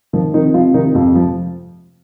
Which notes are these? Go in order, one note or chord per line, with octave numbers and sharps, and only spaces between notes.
D#3 F3 F4
C3 D#3 D#4
C3 F3 F4
C3 D#3 D#4
F2 F3 F4
F3